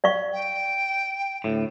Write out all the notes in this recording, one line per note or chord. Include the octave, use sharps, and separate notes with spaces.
D5 F5 C#6
G5
D2 A2